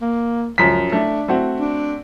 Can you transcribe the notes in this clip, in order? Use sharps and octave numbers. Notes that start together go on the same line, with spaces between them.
A#3
C#2 F#2 F3 B6
A3 D4
A3 C4 F#4
D4